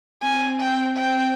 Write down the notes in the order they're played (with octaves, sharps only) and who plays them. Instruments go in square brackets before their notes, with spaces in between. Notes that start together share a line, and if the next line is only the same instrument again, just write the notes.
[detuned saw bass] C4 [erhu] G#5
[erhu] G5
G5